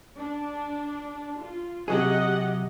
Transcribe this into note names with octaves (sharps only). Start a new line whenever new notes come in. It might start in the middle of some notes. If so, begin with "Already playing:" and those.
D4
F4
C3 F#3 G4 G#4 D#5 F#5